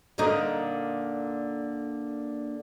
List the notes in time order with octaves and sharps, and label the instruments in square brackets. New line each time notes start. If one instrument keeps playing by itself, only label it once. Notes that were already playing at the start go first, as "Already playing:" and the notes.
[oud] A#2 D3 D#4